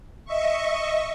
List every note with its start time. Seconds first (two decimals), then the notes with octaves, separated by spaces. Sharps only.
0.25 D#5 E5 C#6